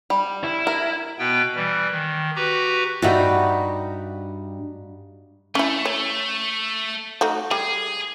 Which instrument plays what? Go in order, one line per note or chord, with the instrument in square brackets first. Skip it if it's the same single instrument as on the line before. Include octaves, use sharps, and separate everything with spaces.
[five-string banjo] G3
[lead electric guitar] E4
[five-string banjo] A#4
[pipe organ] B2 B3 G5
E3 G3
D#3
F#4 G4 B4 A#5
[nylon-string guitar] G2 E5 [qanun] G3 D#4 F#4
[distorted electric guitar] A3 [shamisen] C#4 E4
[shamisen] C#5
A3 D#4 F#4
[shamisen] G3 [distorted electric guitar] G#4